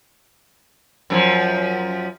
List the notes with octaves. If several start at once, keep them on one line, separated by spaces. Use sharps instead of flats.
F#2 C#3 F3